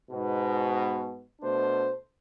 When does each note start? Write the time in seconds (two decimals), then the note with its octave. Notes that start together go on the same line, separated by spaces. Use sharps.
0.11 G#2 B2
1.41 B2 A3 D4 C5